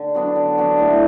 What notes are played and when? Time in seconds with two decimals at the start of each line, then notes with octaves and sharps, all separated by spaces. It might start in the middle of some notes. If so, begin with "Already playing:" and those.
Already playing: D3
0.15 F#3 B3 D4
0.36 D3
0.58 F#3 B3 D4
0.79 A2